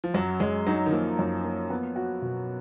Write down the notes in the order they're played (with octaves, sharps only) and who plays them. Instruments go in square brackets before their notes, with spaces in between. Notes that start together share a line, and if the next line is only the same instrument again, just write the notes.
[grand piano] F3
[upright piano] F#2 [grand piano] F#3
[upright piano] F#2 [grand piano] G#3
[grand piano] F#3 [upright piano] D#4
[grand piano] D#3
[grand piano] F3 [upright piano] A#3
[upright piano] F#2
A#3
B3
F#4
B2